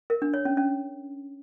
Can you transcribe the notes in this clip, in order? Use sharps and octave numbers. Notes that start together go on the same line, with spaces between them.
A#4
D4
C#5
C#4
C#4